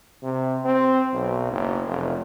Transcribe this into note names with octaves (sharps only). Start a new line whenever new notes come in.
C3
C4
B1
F#1
F1